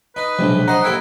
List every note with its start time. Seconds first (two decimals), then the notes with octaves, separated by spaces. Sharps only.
0.16 D#4 B4
0.39 B1 C3 F3 G#3 D4
0.68 C5 D#5 F#5 A#5 C6
0.84 D#2 E4 A4 G5